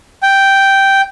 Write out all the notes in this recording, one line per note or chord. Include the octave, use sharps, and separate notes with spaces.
G5